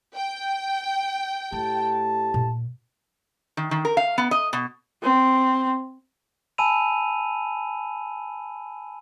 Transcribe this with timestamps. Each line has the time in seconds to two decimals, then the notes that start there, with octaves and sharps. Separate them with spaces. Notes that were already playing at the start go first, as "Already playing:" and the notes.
0.16 G5
1.52 A2 A3 G4 A5
2.34 A#2
3.57 D#3
3.71 D#3
3.85 A#4
3.97 F5
4.18 B3
4.31 D#5
4.53 B2
5.02 C4
6.58 G#5 A5 B5 E6 D#7 F7